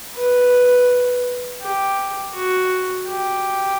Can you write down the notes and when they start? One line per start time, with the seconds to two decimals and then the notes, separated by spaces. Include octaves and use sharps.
0.15 B4
1.62 G4
2.34 F#4
3.08 G4